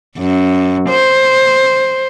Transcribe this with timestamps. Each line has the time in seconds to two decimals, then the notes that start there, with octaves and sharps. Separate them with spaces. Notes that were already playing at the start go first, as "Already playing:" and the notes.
0.18 F#2
0.89 C5